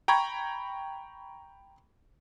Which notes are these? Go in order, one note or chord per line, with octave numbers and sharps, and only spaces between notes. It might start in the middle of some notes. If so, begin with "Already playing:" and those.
G5 A#5 B5 C#6 G#6